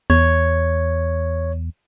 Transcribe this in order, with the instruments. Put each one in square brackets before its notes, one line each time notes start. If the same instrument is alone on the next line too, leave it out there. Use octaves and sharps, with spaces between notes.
[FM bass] E2 [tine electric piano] C#5